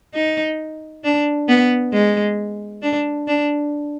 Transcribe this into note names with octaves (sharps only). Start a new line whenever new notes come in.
D#4
D4
B3
G#3
D4
D4